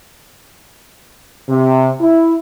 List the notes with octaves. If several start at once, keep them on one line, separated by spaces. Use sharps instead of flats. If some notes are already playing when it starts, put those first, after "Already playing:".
C3
E4